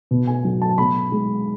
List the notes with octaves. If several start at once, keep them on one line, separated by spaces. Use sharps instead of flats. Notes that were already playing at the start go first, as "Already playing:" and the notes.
B2
G#5
F#3
A5
B2 B5
G#3